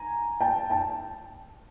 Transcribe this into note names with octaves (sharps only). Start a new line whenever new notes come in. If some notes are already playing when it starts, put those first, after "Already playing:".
Already playing: G#5 A#5
G5 A5
G5 A5